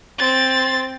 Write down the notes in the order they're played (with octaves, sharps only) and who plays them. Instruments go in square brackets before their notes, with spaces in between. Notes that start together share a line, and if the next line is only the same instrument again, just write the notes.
[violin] C4 A6